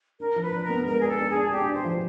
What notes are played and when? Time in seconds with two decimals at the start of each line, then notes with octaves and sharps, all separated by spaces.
0.19 D4 A#4
0.36 F3
0.42 B4
0.53 D4
0.63 A#4
0.69 B3
0.85 G#3 A#4
1.01 D4 G#4
1.08 A4
1.18 D4
1.29 G#4
1.34 D4
1.51 D4 G4
1.69 D4 C5
1.85 F3